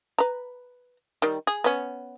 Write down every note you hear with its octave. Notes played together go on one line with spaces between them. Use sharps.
B4 A#5
D#3 G3
G#4
B3 C#4